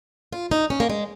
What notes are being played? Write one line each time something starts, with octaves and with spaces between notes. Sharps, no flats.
F4
D#4
C#4
A#3
G#3